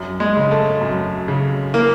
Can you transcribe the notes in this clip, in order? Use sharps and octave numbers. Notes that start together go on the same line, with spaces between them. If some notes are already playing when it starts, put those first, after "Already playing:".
Already playing: F#2
G#3
C#3
A3
F#2
C#3
E3 A#3